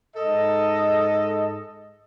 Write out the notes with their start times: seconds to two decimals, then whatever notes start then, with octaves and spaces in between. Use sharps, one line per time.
0.16 G#2 A4 D#5